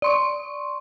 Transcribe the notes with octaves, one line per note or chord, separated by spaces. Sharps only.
D5 C6 C#6